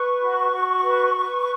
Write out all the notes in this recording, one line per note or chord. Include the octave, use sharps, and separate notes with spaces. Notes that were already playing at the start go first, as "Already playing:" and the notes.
Already playing: B4 C#6
F#4
F#4
B4
B4